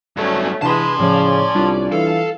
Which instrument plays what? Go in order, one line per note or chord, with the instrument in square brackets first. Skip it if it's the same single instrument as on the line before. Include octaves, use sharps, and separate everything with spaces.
[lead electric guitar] G2 F#3 [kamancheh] A3 C#4
[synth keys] C3 D4 E7 [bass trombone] E3 [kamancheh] G#3 B4 [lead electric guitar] A5 C6
[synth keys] A2 F3 [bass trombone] C#3 [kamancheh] C#4 D5
[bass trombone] C2 [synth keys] G3 D4 F4
[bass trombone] E3 [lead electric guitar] A4 [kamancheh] F5